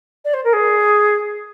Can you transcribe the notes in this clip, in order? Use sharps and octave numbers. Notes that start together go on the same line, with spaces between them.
D5
C5
A#4
G#4